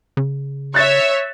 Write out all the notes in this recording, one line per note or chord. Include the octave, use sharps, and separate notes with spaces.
C#3
C#5 E5 F#6 A6